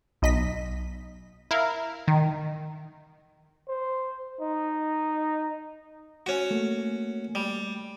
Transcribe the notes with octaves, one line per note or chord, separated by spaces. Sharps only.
B1 D#5 B6
E4 A#4 F5
D#3
C5
D#4
C#4 F#4
A3 A#3
G3